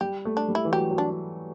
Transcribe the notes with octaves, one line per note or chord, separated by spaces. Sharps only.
G3 G4
A3
D4
G3
E4
E3
F#3 G4
F#3
D4